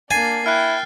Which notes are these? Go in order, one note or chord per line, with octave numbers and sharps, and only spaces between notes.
A#3 D4 G#5 A6 C7
E4 G5 F6 F#6